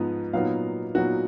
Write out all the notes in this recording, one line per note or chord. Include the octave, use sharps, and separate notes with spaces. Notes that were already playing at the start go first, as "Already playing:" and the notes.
Already playing: G#2 F3 B3 D#4
A#2 F#3 B3 D#4 F5
A#2 F#3 B3 D#4 F#4